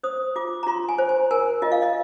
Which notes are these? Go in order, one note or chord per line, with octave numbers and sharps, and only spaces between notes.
C5 D#6
F4 D6
A#5
F4 C6
G#5
C5
G#5
A#4 G#5
F4 D#5
F5
D#5